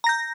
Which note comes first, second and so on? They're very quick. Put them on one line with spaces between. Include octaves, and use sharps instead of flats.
A#5 A#6 G6